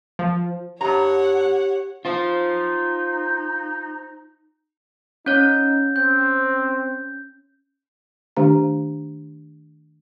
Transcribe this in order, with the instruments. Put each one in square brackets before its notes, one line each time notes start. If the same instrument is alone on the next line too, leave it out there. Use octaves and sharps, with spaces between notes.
[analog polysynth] F3
[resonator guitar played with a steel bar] G2 A#5 [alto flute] G4 [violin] C#5 F#5
[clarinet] D#4 [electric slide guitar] F4 C5
[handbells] C#4 C#5 [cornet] D#4 [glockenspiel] G6
[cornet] C4 [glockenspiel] G6
[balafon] D#3 A3 D4 G4 A#5